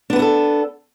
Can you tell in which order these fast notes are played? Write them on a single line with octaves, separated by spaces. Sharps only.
D4 B3 B4 E4 A4